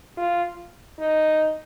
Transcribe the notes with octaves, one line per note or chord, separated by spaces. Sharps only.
F4
D#4